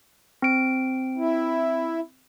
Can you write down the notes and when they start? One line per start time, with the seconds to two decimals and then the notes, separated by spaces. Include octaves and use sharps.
0.42 C4 D7
1.17 E4